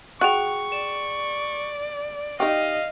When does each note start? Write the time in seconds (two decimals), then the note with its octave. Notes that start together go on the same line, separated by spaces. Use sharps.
0.21 F#4 G#4 G5 C#6 F#6
0.72 D5 E7
2.40 D#4 G4 D#5 F5